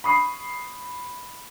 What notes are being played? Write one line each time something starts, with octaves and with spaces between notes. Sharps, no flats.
B5 C#6 D#6 C7